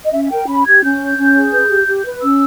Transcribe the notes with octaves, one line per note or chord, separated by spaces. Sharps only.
D#5
C#4 E5
E5
A#4 G5
C#4 B5
G4 G#6
C#4 G6
C#5
C#4
G#4
B4
G4
G4
B4
C#4 E6